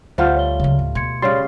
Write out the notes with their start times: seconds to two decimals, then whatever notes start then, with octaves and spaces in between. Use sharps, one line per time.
0.18 D2 G3 A3 F4 C5 F#5 G6
0.36 C#5 G7
0.60 C#3 F#3
0.79 A1
0.95 B2 C6 G#6 C#7
1.22 C#3 G3 C#5 D5 C6 A6